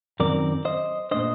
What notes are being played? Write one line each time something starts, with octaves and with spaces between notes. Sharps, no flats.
F#2 D#3 F#3 C4 A#4 D5
C5 D#5
A#2 A3 D4 C5 D#5